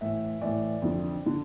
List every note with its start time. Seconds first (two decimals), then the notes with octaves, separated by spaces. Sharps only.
0.01 A2 E3 E5
0.42 A2 E3 D5
0.82 F2 D3
1.26 D3